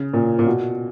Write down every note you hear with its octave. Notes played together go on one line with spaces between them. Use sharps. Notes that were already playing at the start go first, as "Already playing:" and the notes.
Already playing: C#3
A#2
A#2
B2